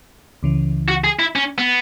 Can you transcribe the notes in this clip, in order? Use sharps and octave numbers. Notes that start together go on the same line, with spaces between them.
C#2 C#3 E3
F#4
G#4
E4
C#4
B3